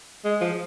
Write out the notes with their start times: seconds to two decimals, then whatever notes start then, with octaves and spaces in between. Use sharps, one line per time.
0.25 G#3
0.41 F3